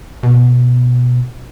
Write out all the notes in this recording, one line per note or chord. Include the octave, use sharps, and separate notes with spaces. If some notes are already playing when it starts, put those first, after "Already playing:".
B2